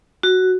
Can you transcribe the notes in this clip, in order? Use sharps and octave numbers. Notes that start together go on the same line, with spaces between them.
F#4